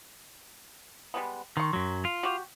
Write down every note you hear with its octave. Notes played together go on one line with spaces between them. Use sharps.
G3 G#3 B3
D#3 C6 C#6
F#2 F#3
F4
F#4 G4